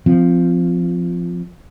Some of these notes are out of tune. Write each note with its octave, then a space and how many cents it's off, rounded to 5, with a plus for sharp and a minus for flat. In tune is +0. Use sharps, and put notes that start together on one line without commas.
F3 -5 C4 -20